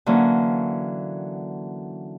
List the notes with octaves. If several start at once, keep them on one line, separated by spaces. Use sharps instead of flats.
D3 E3 F#3 A#3 C#4